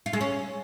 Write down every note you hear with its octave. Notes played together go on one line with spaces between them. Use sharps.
F4
G#3
C#4